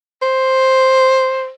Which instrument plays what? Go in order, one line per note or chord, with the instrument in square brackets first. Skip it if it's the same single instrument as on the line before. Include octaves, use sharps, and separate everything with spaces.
[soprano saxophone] C5